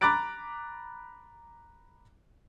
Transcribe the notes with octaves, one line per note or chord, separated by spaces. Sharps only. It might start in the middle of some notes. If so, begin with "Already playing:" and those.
A#5 B5 D6 F#6 A6 D7